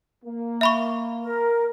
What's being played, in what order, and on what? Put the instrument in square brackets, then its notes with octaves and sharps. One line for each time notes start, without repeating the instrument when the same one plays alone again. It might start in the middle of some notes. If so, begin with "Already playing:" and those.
[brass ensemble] A#3
[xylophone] E5 B5 C#6
[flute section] A#4